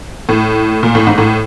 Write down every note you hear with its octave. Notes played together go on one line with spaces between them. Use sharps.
A2
A#2
A2
G#2
A2